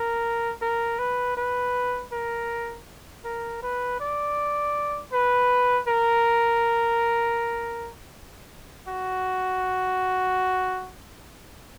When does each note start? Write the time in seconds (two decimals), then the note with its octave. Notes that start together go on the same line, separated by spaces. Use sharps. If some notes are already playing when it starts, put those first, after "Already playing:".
Already playing: A#4
0.62 A#4
0.99 B4
1.37 B4
2.12 A#4
3.25 A#4
3.62 B4
4.00 D5
5.13 B4
5.88 A#4
8.88 F#4